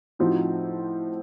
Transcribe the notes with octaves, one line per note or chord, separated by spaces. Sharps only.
A2 F3 C4 D#4 F#4